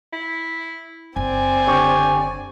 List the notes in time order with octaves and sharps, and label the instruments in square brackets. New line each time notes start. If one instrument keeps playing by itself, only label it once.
[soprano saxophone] E4
[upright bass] F#1 [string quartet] C4 D5 [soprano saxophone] G#5
[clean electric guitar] D3 G4 C#5